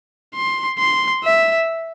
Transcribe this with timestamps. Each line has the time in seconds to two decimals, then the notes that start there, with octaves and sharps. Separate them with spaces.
0.35 C6
0.79 C6
1.24 E5